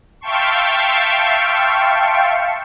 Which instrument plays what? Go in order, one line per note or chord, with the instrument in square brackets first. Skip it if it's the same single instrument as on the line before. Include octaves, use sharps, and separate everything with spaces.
[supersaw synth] E5 F5 G5 A5 C6 C#6